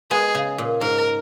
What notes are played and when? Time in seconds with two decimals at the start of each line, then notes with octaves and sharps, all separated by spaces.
0.11 G#3 B3 G#4
0.35 C#3
0.58 A#2
0.81 G#2 A#4